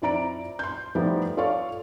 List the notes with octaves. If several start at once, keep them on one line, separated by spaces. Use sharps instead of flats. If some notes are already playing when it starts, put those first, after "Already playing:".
F2 E4 D5 A#5 D7
C6 G6
F3 G3 A3 B3 D#4 E4
F4 A4 C#5 D5 F5 C#6